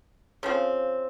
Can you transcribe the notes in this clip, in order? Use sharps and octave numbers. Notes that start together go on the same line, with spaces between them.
C#3 F3 C4